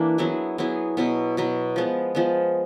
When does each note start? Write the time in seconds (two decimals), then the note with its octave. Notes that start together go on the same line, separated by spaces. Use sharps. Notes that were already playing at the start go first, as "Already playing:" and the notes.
Already playing: E3 A#3 D4
0.18 F#3 B3 E4 G#4
0.58 F#3 B3 E4 G#4
0.97 B2 F#3 B3
1.37 B2 F#3 B3
1.76 F3 G#3 B3
2.15 F3 G#3 B3